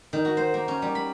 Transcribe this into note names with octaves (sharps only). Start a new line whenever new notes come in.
D#3
F#4
C5
A#3
C#4
G3
B5